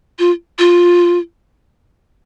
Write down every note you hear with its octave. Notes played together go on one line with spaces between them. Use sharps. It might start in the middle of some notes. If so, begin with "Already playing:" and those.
F4
F4